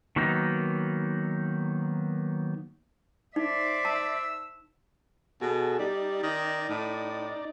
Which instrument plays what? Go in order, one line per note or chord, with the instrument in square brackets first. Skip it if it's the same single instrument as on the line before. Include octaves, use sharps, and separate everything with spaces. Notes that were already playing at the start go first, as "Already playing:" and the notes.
[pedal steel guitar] D#3 F#3 A#3 B3 D#4
[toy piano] D#4 [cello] C5 E5 [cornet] D5
[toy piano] A5 [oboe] E6
[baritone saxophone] B2 [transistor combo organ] F#4 G#4 A4
[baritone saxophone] G3 [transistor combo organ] D#4 D5
[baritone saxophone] D#3
A2